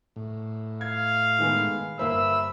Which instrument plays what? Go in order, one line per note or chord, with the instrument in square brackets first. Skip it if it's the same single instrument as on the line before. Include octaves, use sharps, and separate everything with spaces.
[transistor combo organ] A2
[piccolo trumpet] F5 [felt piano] G#6
[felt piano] D#3 G#3 B3
[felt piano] G1 A#3 C5 [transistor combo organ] E5 B5 [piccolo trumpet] E6